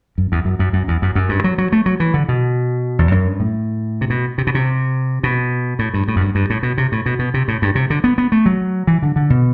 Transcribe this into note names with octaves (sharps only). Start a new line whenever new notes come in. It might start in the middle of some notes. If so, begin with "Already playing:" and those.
F#2
E2
F#2
F#2
F#2
E2
F#2
F#2
G2
F#3
F#3
A3
F#3
E3
D3
B2
E2
F#2
G2
A2
C3
B2
C3
B2
C3
B2
A2
G2
A2
F#2
G2
G2
A2
B2
C3
A2
B2
B2
C3
A2
G2
C3
D3
B3
B3
A3
F#3
E3
D3
D3
B2